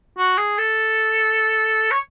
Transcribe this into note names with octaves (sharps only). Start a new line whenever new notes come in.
F#4
G#4
A4
C#5